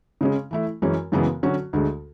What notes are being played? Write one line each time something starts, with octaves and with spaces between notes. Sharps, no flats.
C#3 G#3 C#4
E3 A3 E4
F#2 E3 G#3 C#4
F#2 C#3 E3 G#3 B3
D3 F#3 C#4 F#4
D2 D3 G#3